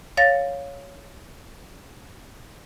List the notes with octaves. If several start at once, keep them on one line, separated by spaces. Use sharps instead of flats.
C#5 F5 A6 A#6